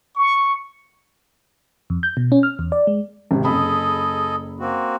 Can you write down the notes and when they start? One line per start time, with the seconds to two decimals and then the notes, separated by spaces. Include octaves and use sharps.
0.16 C#6
1.90 F2
2.03 G6
2.17 B2
2.32 C#4
2.43 F6
2.59 E2
2.72 D5
2.87 G#3
3.31 G#1 C3
3.45 F#1 G#4 A4 D#5 B5
4.60 A#3 C4 F#4